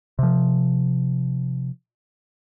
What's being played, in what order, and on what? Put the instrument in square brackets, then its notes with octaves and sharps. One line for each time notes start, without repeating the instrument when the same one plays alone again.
[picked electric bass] C3 F3